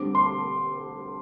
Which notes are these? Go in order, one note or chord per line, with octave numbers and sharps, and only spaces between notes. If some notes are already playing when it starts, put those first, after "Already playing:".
Already playing: D3 G3 C4 D6
C6